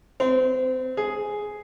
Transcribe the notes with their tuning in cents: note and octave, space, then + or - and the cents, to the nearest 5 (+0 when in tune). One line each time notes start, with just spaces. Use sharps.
C4 -25
G#4 +5